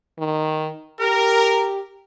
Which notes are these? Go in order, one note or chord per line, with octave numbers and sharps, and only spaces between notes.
D#3
G4 A#4